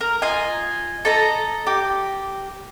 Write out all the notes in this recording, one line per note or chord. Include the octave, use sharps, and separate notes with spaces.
A#4
F4 D#5 G#5
A4 D#5 A#5
G4